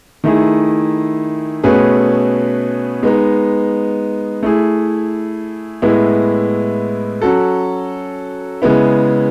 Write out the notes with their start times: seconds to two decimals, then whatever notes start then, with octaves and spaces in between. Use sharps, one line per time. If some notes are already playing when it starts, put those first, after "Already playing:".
0.24 D#3 A3 E4 G#4
1.64 B2 A3 C#4 G#4 B4
3.03 G#3 B3 D#4
4.43 A3 E4 G#4
5.82 A2 G#3 B3 E4
7.22 F#3 C#4 F#4 A4
8.62 C#3 G#3 B3 E4